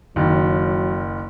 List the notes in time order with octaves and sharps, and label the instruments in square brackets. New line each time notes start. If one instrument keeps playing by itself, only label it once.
[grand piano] F#1 D#3 [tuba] F#3